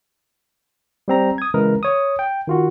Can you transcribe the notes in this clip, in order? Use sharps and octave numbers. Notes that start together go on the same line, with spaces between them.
G3 C4 A#5
D#6 G#6
C#3 E3 G#3 A#4 B4
C#5 D#6
G5
D#3 F4 F#4